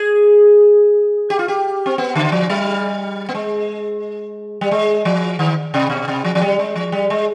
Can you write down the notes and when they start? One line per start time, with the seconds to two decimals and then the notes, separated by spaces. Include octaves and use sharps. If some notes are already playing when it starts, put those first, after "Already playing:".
Already playing: G#4
1.30 G4
1.39 F4
1.48 G4
1.86 C4
1.98 B3
2.15 D3
2.32 F3
2.50 G3
3.29 B3
3.35 G#3
4.61 G3
4.71 G#3
5.05 F3
5.39 D#3
5.74 C3
5.90 B2
6.08 C3
6.24 F3
6.35 F3
6.42 G3
6.59 G#3
6.76 F3
6.92 G3
7.10 G#3